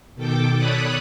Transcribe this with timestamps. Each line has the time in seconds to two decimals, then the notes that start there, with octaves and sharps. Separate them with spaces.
0.15 B2 D#3 A4 G5 D6
0.56 A4 C#5 D5 B5 D#6 F#6